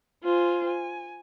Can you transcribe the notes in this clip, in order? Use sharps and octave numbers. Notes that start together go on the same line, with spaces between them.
F4 C5 G#5
G#5